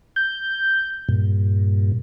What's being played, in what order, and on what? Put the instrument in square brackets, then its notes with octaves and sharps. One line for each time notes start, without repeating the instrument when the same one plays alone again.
[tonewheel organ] G6
G2 A#2